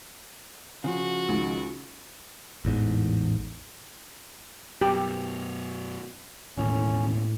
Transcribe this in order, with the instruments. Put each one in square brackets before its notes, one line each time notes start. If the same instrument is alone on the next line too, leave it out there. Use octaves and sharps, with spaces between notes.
[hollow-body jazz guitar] C#3 F3 [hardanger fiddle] F#4
[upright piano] C#2 D#3
[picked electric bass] A1 E2 G#2
[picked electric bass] F#2 B2 [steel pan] G4
[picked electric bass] E1 D#2 [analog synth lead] A2 [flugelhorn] C#4